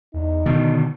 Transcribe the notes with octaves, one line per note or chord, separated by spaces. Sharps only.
E2 D#4
B2 D3 D#3